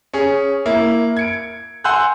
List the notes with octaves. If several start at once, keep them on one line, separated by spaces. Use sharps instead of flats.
C#4 G#4
A#3 E4
G#6 C#7 D7
F#5 G#5 C6 E6 F#6 G6